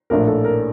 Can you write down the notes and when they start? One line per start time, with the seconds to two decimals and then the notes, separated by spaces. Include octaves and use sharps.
0.10 A#1 A2 A3 D4 A#4
0.28 A4
0.44 A#4